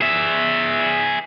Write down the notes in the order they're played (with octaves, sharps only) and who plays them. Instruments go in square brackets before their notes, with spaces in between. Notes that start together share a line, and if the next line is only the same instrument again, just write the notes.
[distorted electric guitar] G#4 E5